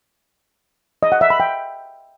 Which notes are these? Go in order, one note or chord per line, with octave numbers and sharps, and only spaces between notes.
D#5
F#5
E5
B5
G5